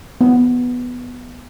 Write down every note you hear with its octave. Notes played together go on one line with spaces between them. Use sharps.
B3